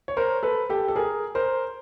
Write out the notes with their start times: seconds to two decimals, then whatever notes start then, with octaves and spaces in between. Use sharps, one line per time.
0.08 C#5
0.17 A#4 C5
0.43 A4 B4
0.70 G4 A4
0.88 A4
0.96 G#4 A#4
1.35 A#4 C5